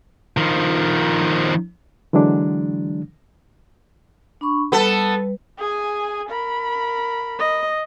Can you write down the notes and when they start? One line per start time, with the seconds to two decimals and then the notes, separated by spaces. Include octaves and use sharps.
0.37 D#3 F3
2.13 D3 E3 F#3 G#3 D4
4.41 D4 B5 C#6
4.72 G3 B3 A4 B4
5.59 G#4 G#5
6.30 A#4 B5
7.39 D#5